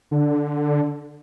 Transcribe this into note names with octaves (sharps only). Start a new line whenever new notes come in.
D3